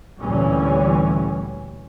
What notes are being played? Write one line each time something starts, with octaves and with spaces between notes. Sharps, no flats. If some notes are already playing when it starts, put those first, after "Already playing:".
D2 A#2 D3 E3 G3 C#4